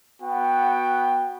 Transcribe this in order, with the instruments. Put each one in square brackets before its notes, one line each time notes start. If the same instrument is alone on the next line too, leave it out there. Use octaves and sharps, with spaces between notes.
[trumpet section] B3 F#4 G5